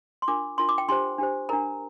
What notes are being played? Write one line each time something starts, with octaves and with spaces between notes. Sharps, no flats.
C6
D4 F4 A#4 D6
D4 F4 A#4 C6
D6
G5
D4 G4 C5 C6
D4 G4 C5
D4 A#4 A#5